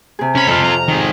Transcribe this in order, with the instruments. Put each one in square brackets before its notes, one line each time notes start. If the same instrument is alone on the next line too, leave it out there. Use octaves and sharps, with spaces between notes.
[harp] C3 G#4
[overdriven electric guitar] C#2 B5 [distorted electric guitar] C#4
[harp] F2 F6 [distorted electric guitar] F4 A4
[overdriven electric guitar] A#5
[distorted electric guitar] D#3 G#4